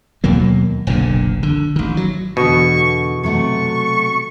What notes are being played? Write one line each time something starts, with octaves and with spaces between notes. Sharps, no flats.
D#2 B2 F#3 A#3
F#1 B1 A#2 D3
D3
A1 D#3
F#3
E2 B2 D3 C#6
C3 F#3 A3 C#6